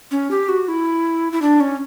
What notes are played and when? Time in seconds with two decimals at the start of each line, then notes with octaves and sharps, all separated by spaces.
0.11 C#4
0.31 G4
0.49 F#4
0.68 E4
1.32 E4
1.42 D4
1.60 C#4